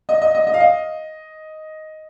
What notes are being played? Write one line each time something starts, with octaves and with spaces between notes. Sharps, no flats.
D#5
D#5
D#5
D#5
F5
D#5